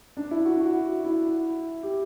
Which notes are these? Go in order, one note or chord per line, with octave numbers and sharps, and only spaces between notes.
D4
E4
F#4
F#4
E4
G4